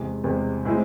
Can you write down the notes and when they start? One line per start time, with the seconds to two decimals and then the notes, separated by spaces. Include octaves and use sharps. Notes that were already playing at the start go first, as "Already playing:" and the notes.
Already playing: E2 C3 G#3
0.24 E2 C3 G#3
0.65 A2 G#3 C4 E4